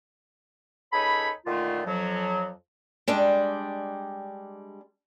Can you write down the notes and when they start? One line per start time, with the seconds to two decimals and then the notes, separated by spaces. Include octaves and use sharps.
0.92 C#2 D#4 A4 C#5 G#5 B5
1.45 A#2 D3 D#3 A3 F4
1.86 F2 F3 F#3
3.08 G3 G#3 D4 G5